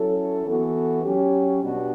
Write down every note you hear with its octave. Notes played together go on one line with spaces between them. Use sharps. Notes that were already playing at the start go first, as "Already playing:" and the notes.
Already playing: F#3 C#4 E4 A4
E3 B3 F#4 A4
F#3 C#4 G4
B2 G3 B3 D4 F#4